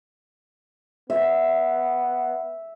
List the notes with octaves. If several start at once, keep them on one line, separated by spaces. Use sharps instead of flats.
B3 E5